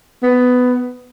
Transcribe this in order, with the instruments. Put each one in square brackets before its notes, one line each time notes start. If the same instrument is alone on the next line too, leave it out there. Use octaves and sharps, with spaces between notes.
[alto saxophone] B3